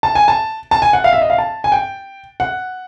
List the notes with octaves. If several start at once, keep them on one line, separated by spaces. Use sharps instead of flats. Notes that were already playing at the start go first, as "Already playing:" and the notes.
A5
G#5
A5
A5
G#5
F#5
F5
E5
D#5
F5
A5
G#5
G5
F#5